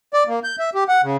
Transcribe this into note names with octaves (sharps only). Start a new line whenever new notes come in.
D5
A#3
G6
E5
G4
F#5
C#3